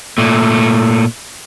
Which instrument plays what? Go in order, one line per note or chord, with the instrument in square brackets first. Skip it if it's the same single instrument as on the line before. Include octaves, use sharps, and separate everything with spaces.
[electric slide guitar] A#2 A3